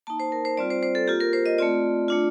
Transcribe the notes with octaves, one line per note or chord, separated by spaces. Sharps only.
A#3 D#4 A5
C5
A#4
C5
G3 C4 F4 D5
C5
C5
A4
A#3 F4 G4
A#4
C5
D#5
A3 C4 F4 D5
A3 D4 F4